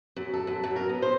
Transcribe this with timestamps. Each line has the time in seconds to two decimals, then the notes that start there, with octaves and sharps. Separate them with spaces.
0.16 F#2
0.34 A4
0.47 F#2
0.63 F#2
0.76 A#4
0.89 B3
1.02 C5